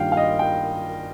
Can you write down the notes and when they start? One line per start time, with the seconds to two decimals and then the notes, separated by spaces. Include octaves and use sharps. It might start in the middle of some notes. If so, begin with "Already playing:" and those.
Already playing: G2 D#3 A#3 F4 F5 G5
0.12 F5
0.17 D#5
0.39 G5